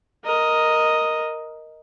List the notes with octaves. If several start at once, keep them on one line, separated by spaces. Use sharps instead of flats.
A#4 D#5